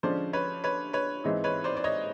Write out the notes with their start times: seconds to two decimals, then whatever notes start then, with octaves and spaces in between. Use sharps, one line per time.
0.03 D3 F3 G#3 C#4 C5 D5
0.33 B4 C#5
0.64 B4 C#5
0.93 B4 C#5
1.24 G#2 E3 G#3 C4 D#4
1.44 B4 C#5
1.64 C5 D5
1.77 D5
1.84 C#5 D#5